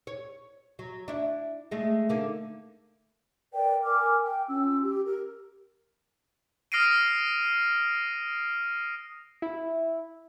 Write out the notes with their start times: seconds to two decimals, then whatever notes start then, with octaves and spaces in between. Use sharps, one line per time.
0.07 C#5
0.79 F#3
1.08 D4 E4
1.71 G#3 A3
2.09 D3 A#3 D#4
3.53 A#4 B4 D5 G5
3.84 A#4 G#5 D6 F6
4.23 G5
4.48 C#4 F4 E6
4.81 G4
5.04 A#4
6.72 D#6 F6 A#6 C7 D7 D#7
9.42 E4